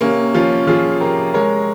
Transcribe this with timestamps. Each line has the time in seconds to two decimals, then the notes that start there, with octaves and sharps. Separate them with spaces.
0.01 C3 A#3 C#4
0.34 F3 C#4 F4
0.67 F3 F4 G#4
1.00 C3 G4 A#4
1.34 G#3 A#4 C#5